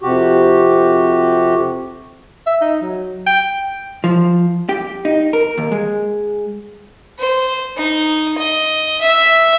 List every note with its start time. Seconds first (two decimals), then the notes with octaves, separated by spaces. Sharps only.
0.02 F2 C3 F#4 G4
2.47 E5
2.62 D#4
2.81 F#3
3.27 G5
4.04 F3
4.69 G4
5.05 D#4
5.33 A#4
5.58 D#2
5.72 G#3
7.19 C5
7.76 D#4
8.38 D#5
9.01 E5